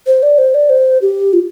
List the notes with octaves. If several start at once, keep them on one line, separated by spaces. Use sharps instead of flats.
C5
D5
C5
D5
C5
G4
F4